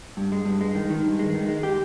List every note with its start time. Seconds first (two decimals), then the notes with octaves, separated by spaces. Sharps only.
0.17 G2
0.32 G#3
0.45 G2
0.61 G#3
0.75 D#3
0.90 D#3
1.05 G2
1.19 G#3
1.34 D#3
1.48 G#3
1.63 G4